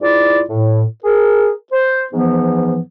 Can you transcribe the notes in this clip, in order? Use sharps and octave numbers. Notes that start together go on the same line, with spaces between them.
G#2 E4 F4 D5
A2
G#4 A#4
C5
G#2 E3 F3 B3